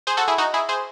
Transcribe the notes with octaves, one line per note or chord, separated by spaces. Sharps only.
G#4 C5
F#4 A4
E4 G#4
D#4 F#4
E4 G#4
G#4 C5